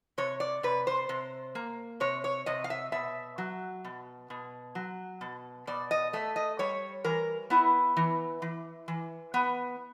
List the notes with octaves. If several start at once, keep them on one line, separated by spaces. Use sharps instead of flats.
C3 C#5
D5
C3 B4
C5
C3
A#3
C3 C#5
C#5
C3 D#5
F5
E5
B2 E5
F#3
B2
B2
F#3
B2
B2 D5
D#5
A3 E5
D#5
G3 C#5
E3 A#4
B3 E4
E3
E3
E3
B3